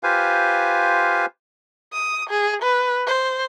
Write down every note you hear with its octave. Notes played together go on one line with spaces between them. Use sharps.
F4 G4 B4 C5 F5 G#5
D#6
G#4
B4
C5